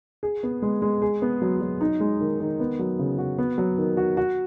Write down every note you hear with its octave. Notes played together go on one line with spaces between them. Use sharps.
G#4
B3
G#3
G#3
G#4
B3
F#3
F#3
D#4
G#3
D#3
D#3
B3
F#3
C#3
F#4
B3
F#3
D#3
F#4
F#4